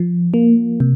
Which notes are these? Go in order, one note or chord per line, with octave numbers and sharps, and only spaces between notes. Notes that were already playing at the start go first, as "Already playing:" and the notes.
Already playing: F3
A#3
C3